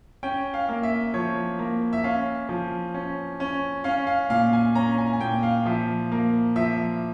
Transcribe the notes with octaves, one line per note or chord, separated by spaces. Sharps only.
C#4 G5
F5
A#3
E5
F3 C#5
A#3
E5
C#4 F5
F3
C#4
C#4
C#4 F5
F5
A#2 F5
G#5
C#4 A#5
G#5
G#5
A#2 G5
F5
F3 E5
A#3
F3 E5